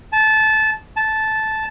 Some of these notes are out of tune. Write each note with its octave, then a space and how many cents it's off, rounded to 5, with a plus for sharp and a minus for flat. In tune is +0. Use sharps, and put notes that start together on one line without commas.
A5 -20
A5 -10